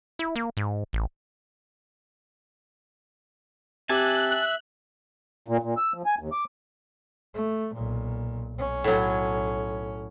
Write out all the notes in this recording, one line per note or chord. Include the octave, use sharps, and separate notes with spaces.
E4
A#3
G#2
A1
C4 G4 E5 G#5 A5 F#6
A#2
A#2
E6
F3
G#5
D#2
D6
A3
B1 A#2
B1 C#4
A2 F#3